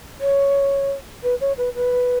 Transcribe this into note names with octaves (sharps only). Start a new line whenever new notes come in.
C#5
B4
C#5
B4
B4